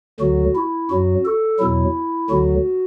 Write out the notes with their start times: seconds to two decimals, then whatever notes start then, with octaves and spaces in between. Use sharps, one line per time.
0.20 D2 D3 F#3 F#4
0.56 E4
0.90 F#2 F#3 F#4
1.25 A4
1.60 E2 B2 F#3 E4
2.30 D2 D3 F#3 F#4